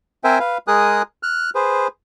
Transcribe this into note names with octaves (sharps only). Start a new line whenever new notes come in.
C4 A#4 C5 E5 G5 G#5
B4 F5
G#3 G#4 A#4 G#5 D#6 F#6
F6 F#6
G#4 B4 C5